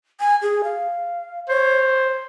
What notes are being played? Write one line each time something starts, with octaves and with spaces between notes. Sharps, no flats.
G#5
G#4
F5
C5 C#5